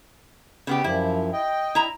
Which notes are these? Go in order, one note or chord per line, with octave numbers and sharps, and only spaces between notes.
C#3 B3 G4
F#2 F3 E4
D#5 G5
E4 A#5